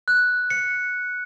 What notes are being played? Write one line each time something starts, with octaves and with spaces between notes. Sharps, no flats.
F#6
C#7